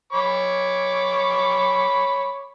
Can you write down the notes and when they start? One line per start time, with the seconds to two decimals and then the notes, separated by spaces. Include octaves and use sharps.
0.13 C#5 B5 D6